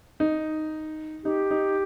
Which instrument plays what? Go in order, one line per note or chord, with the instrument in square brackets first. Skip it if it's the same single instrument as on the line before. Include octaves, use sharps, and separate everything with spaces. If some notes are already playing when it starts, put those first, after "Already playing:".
[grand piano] D#4
[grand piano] D#4 [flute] G4
[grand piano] D#4